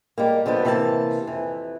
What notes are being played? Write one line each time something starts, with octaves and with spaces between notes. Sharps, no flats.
G3 G#3 A#3
D3 F3 G#3 B3
C3 E3 A#3 E5 A5
F2 E3